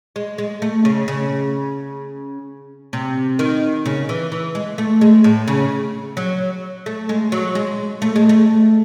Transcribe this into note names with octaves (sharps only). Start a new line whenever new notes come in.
G#3
G#3
A3
C#3
C#3
C3
D#3
C#3
E3
E3
G#3
A3
G#3
A2
C#3
F#3
A3
G#3
F#3
G#3
A3
G#3
A3